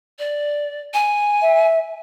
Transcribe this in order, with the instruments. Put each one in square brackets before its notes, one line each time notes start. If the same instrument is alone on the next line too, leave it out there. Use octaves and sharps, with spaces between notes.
[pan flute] D5
G#5
[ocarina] E5